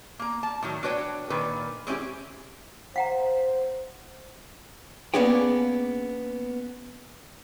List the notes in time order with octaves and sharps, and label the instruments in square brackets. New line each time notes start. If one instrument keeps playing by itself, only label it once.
[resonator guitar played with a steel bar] A#3 A#5
A5
A2 D#3 F#3
D4 F#4 B4 C#5 G5
A#2 D#3 B4
G#3 C4 C#4 E4 G4
[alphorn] C5 [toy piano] F5 F#5 A#5
[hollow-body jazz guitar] A#3 B3 C#4 D4 G#4 G5